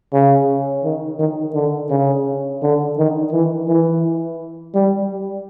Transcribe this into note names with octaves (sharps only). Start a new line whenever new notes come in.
C#3
D#3
D#3
D3
C#3
D3
D#3
E3
E3
G3